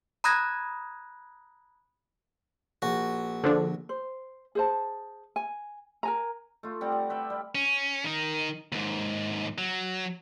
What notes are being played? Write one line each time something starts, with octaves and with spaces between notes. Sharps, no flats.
A#5 B5 D#6 F#6 G#6 A#6
A#1 F#4
D3 F3 D4
C5
G#4 C5 A5
G#5
A#4 G#5 A#5
A3 F4
G3 C4 G4 F#5
D5
B4 E5 G5
G3
C#4
D#3 D#4
D#2 G#2
F#3